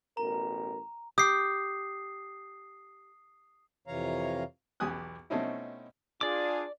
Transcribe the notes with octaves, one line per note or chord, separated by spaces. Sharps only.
A1 B2 A#4 A#5
G4 D#6 C7
F2 C3 E3 C#5 F5 A#5
B1 E2 G4 G#5 D#6 F#6
B2 A3 C4 C#4 D#4 E4
D4 F4 G#4 D5 D6